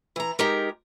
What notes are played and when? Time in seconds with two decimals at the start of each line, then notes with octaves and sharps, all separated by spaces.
0.16 E3 A#5
0.39 G#3 D#4 G4 A#4